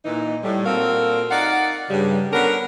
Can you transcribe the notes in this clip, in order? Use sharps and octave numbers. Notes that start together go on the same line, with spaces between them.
A#2 E3 D#4
A2 G3
A#2 C4 F#4 A4 A#4 F5
D#4 D5 F5 F#5
G2 C#3 G3
D3 B3 C#4 D4 A#4